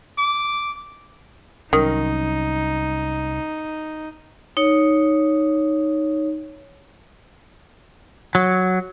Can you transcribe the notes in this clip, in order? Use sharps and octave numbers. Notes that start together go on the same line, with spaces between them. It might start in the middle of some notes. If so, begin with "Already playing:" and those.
D6
C2 D#3 F#3 C#4 D#4
D#4 C#5
F#3